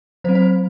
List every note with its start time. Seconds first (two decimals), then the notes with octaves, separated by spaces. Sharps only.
0.24 F#3 C5
0.29 C4
0.35 C5